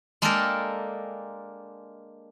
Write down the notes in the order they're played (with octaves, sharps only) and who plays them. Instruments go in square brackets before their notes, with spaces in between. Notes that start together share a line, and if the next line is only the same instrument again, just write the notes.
[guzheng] G#3 A#3 D4 G4 A4 A#4